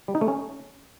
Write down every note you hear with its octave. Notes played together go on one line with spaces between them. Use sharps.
G3
D#4
A3
C#4